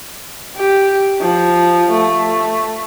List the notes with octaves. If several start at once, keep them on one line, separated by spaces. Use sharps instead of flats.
G4
F3
A3